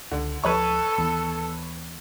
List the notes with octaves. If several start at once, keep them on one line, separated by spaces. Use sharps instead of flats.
C#2 D3
D1 F3 A4 B4 C#5 C#6
D#2 E3 B3